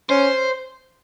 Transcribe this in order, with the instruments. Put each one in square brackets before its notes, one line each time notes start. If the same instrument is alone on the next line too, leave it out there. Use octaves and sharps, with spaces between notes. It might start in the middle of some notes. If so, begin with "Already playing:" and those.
[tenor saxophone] C#4 [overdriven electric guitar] C5